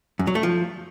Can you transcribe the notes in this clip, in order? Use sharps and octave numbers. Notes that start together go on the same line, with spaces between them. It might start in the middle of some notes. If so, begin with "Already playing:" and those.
F#2
F#3
A3
F3